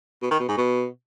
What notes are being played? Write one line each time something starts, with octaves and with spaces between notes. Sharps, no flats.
B2
D#3
B2
G#2
B2